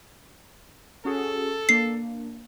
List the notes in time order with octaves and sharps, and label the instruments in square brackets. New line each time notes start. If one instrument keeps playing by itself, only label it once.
[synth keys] C#4 F#4 G#4 [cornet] A4
[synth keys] A#3 D4 [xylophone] C7